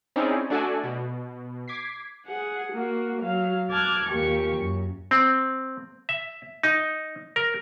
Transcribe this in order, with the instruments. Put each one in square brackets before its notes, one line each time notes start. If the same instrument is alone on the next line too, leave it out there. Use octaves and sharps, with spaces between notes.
[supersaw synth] C4 C#4 D#4 E4 G#4 D5
A3 D4 F#4 A4 D5 G#5
B2
D6 G#6 B6 C7
[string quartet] G#4 F#5
A#3 F#4
F#3 F5
A5 D6 F6 F#6 G#6
D#2 A#2 A#3 G4 C#6
F#2
[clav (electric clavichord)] C4
E5
D#4
A#4